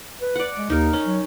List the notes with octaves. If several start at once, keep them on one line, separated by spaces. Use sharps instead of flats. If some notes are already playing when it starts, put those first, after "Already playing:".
B4
D5 F#5
G#3
D#2 D#4 A#4
C#4
F#3